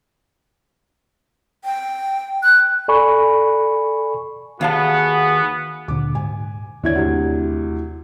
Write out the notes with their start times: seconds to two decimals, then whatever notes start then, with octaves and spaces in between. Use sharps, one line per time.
1.65 G5
2.43 F#6
2.88 A4 D5 G#5 B5 C#6
4.61 D#2 B3 F#4 G#4 F5 A5
5.88 D2 A#2 D3 D6
6.15 G#2 G#5
6.84 D#2 D3 E4 C#5 D5 G#6
6.95 D2 C3